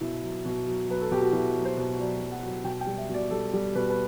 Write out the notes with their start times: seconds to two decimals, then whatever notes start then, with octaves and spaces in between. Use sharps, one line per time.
0.01 B2 E4
0.22 F#3
0.45 B2
0.67 F#3
0.88 F#3 B4
1.01 A4
1.11 B2 G4
1.22 F#4
1.32 B2 E4
1.55 F#3
1.65 C5
1.77 B2
1.99 F#3 D5
2.20 F#3
2.32 F#5
2.43 F#3
2.64 B2 G5
2.81 G5
2.86 G3
2.98 E5
3.09 B2 D5
3.30 G3 A4
3.53 G3 G4
3.75 B2 B4
3.90 B4